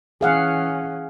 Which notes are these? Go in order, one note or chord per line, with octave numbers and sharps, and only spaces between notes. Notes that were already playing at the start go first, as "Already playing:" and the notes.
E3 C#4 G#4 F5 F#5